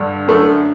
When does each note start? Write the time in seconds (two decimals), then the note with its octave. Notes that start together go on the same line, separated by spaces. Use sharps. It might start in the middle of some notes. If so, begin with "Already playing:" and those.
Already playing: G2 D3
0.28 F#2 D3 A3